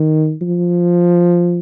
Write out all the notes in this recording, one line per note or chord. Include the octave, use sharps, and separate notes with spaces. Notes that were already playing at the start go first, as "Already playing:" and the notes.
Already playing: D#3
F3